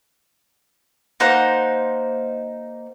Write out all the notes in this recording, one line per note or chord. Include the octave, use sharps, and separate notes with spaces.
A#3 D#4 C5 F#5